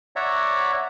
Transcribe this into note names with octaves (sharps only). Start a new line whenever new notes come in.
C#5 D5 E5 F#5 A#5